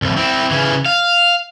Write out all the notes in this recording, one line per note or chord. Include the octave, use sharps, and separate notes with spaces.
C2 F2
C4 E4
C#3 E3
F5